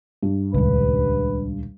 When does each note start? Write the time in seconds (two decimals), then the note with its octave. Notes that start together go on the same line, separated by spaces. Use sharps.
0.23 G2
0.54 D#1 C#2 B4